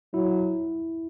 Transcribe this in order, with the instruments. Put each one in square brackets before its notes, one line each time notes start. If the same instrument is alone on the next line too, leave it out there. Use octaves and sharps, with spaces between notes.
[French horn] F#3 [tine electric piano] E4